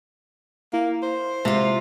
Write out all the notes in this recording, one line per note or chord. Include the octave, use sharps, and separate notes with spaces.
A#3 E4
C5
C3 G#3 F4